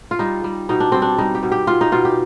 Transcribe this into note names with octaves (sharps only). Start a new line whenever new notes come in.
F4
G3 D#4
G3
B2 D#4
D4
G3 C4
D4
G3 D#4
G4
B2
G4
B2 F4
D#4
B2 F4
G4